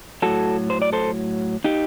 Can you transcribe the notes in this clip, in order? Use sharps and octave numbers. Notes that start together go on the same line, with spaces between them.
A2 F#3 F#4 A4
C5
D5
A4 C5
D#4 G4